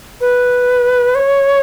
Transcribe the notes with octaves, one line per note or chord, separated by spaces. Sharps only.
B4
C#5